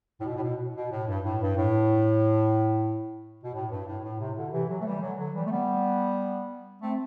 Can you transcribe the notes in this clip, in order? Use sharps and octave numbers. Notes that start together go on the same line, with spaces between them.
A2
B2
A2
B2
B2
A2
G2
A2
G2
A2
B2
A2
G2
A2
A2
A2 C3
B2 D3
C3 E3
D3 F#3
A3
E3 G3
D3 F#3
D3 F#3
E3 G3
A3
G3 B3
A3 C4